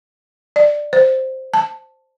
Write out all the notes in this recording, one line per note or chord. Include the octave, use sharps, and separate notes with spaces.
D5
C5
A5